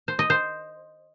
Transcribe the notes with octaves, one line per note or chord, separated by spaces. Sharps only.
C5
D#5
C5